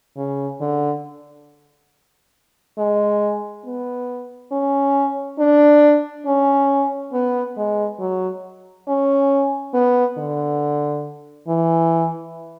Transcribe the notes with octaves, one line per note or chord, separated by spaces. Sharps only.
C#3
D3
G#3
B3
C#4
D4
C#4
B3
G#3
F#3
C#4
B3
D3
E3